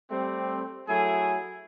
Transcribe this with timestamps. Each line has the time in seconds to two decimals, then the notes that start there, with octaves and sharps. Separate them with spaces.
0.10 G3 A3 C4
0.88 F#3 A3 E4 G#4